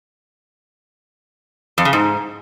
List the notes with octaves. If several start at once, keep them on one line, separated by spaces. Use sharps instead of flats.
F2
C#3
G#2